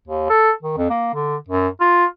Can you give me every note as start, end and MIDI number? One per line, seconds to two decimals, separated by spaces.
0.07 0.26 39
0.30 0.51 69
0.63 0.77 51
0.77 0.87 41
0.90 1.10 58
1.14 1.36 50
1.49 1.68 42
1.81 2.05 65